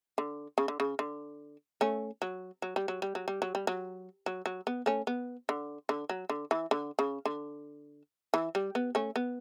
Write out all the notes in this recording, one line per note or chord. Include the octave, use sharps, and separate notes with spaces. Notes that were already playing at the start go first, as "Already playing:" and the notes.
D3
C#3
D3
C#3
D3
A3 C#4
F#3
F#3
G3
F#3
G3
F#3
G3
F#3
G3
F#3
F#3
F#3
B3
A3 C#4
B3
D3
D3
F#3
D3
E3
D3
C#3
D3
E3
G3
B3
A3 C#4
B3